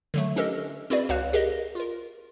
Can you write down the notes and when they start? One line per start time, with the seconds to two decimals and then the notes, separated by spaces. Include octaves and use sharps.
0.14 D3 F#3 A3
0.36 C#4 D4 G4 A4 A#4 D#5
0.90 C4 E4 F#4 G#4 B4 D5
1.09 C#2 F#4 C#5 F5 F#6
1.33 G4 G#4 A#4 D#5
1.75 F4 A#4